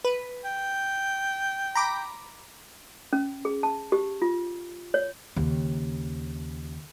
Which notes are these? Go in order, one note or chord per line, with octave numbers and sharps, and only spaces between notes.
B4
G5
A#5 B5 D6
C#4
G#4
A5
G4
F4
C#5
D#2 C#3